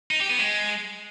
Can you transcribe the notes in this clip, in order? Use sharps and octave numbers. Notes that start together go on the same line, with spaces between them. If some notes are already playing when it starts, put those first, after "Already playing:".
D#4
G4
B3
G#3